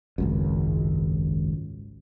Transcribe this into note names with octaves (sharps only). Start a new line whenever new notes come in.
G#1 C#2 F#2